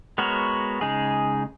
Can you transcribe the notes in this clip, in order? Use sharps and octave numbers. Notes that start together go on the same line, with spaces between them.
G#3 B3 F#4 A#4 C#5
C#3 G#3 D#4 G#4